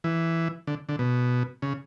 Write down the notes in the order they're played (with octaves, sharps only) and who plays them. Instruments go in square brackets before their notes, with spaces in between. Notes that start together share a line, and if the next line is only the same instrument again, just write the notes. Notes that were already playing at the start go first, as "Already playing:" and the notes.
[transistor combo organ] E3
D3
D3
B2
C#3